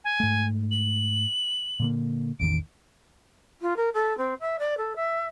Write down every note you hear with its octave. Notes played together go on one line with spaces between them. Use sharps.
G#5
G#2 A3
F#7
A#2 D3 A#3
A1 E2 D#3 D7
F4
A#4
A4
C4
E5
D5
A4
E5